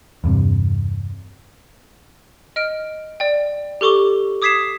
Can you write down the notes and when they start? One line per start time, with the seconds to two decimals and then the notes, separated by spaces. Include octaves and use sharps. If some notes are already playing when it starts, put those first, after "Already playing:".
0.24 E2 G2 C3
2.56 D#5 F6 D7
3.20 D5 G5
3.81 G4 A4 C#6 D6 G7
4.42 D6 D#6 G#6 B6 C7 E7